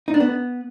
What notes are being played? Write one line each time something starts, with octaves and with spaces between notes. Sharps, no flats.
D#4
D4
B3